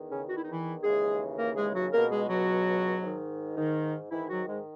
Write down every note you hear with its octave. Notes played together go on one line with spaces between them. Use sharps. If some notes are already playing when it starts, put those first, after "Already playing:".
Already playing: E2 D#3
C#3 C#4
F#4
E4
D#4
E3 E4
D#2 C#3 E3 G#3 G#4
A#3 A#4
G#3 G#4
F#3 F#4
C#2 B2 A#3 A#4
G#3 G#4
F#3 F#4
G#2 D#3
D#3 D#4
G#2 D#3 E3 E4
F#3 F#4
G#2 G#3